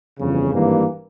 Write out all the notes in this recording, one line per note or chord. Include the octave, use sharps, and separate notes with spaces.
G1 F2 C#3 E3
G#1 G2 E3 A#3